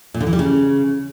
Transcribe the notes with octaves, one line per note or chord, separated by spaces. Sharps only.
A#2
D3
E3
G3
C#3